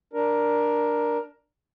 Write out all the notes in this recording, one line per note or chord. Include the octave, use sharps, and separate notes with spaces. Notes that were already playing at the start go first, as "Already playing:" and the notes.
D4 A#4